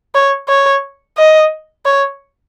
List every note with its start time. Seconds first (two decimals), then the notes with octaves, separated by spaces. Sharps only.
0.15 C#5
0.49 C#5
1.17 D#5
1.86 C#5